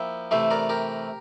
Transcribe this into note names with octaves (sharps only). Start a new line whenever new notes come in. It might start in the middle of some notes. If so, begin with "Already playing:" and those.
Already playing: F3 A#3 E4 E5 G5
C3 E3 A3 C5 E5
A#4 D5
G4 A#4